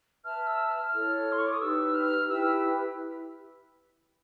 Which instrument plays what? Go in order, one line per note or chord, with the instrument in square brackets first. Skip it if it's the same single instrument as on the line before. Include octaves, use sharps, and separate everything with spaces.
[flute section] B4 E5 A5 [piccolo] F6
[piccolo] E6
F6
[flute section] E4 A4 C#5
[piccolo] C6
C#6
D6
D#6
[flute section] D#4 G4 B4 [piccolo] E6
[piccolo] F6
[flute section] E4 G4 B4 [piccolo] E6